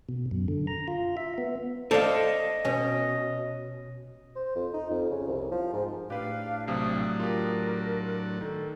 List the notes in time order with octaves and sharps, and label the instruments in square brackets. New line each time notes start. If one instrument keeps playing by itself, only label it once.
[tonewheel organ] B2
F#2
D3
A#5
F4
E5
B3
[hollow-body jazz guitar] A4 D5 [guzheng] C5 F5 [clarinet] D#5
[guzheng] B2 C#4
[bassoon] C5
F2
D#4
F2
C#3
C2
F3
G#2
[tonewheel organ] A2 D4 [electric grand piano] G4 B4 [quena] F5
[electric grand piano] A#1 C3 [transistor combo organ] F#3 A3 [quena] D#6
[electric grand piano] F4 G4 [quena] A#4
[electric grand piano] D#3 [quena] A4